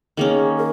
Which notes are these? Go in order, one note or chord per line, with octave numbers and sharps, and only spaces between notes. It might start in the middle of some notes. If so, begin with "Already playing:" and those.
D#3 A#3 C#4 G#4
A#4